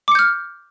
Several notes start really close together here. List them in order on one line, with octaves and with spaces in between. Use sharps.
D6 C#7 G6 F6